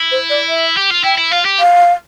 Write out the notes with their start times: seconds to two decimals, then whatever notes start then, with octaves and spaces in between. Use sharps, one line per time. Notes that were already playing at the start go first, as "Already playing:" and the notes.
Already playing: E4
0.11 C5
0.30 D5
0.49 E5
0.77 G4
0.90 F4
1.04 E4 G5
1.18 E4
1.31 F4 F5
1.45 G4
1.59 F5